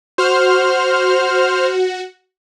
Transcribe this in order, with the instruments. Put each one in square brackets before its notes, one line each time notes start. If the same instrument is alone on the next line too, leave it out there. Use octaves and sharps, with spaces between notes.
[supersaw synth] F#4 [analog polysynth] C5 F6